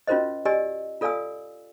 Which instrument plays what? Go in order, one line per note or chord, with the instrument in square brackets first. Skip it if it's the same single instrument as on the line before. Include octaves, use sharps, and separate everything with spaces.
[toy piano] C#4 F4 F#4 A#4 C5 D#5
G4 D5 D#5 G#5 E6
F4 A4 D5 F5 G#5 E6